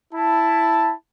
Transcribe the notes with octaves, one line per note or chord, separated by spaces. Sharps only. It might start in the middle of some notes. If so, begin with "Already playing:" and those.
E4 A5